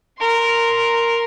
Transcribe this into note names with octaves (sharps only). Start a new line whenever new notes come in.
A#4 C6